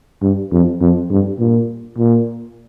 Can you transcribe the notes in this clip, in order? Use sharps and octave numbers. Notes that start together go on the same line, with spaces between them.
G2
F2
F2
G2
A#2
A#2